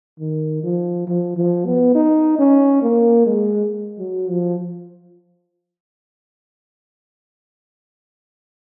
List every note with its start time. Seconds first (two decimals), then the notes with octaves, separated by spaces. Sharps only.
0.19 D#3
0.63 F3
1.07 F3
1.37 F3
1.65 B3
1.95 D#4
2.39 C#4
2.82 A#3
3.26 G#3
3.99 F#3
4.28 F3